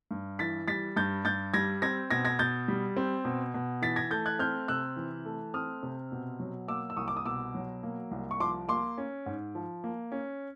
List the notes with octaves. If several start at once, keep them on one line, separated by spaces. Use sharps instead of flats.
G2
E3 A6 B6
G3 A6 B6
G2 G6 A6
G2 G6 A6
G3 G#6 A#6
C4 G#6 A#6
B2 G#6 A#6
G#6 A#6
B2 G6 A6
G3
C4
B2
B2
E3 A6 B6
G#6 A#6
A3 G6 A6
F#6 G#6
C4 F6 G6
C3 E6 F#6
E3
A3
C4 D#6 F6
C3
B2
F#3
A#3 D6 E6
E6
C2 C#6 D#6
D6
D#6
B2 D6 E6
F#3
A#3
C2
C#6
F3 C6 D6
A#3 C6 D6
C#4
G#2
F3
A#3
C#4